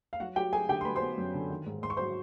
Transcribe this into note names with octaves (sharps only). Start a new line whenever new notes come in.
F5
F#3 F#4 F#5
F#3 G4 G5
F#3 G#4 G#5
D3 G4 G5
C6
F#3 B4 B5
C5 C6
B3
F#2
D3
D#3
G#2
G#2 C6
C#6
F#3 C5 C6